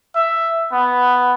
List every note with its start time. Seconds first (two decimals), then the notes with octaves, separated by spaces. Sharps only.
0.15 E5
0.72 B3